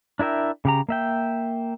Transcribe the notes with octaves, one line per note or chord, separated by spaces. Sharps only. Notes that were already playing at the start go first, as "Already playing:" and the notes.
D4 E4 A#4 E5 G5
C#3 G4 A#5
A#3 E5 G5